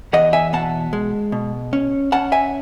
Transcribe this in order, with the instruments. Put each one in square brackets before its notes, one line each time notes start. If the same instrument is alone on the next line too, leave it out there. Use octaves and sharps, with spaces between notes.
[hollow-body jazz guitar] E2 D#5 F#5
E5 G#5
B2 F#5 A5
G#3
B2
C#4
C#4 F#5 A5
E5 G#5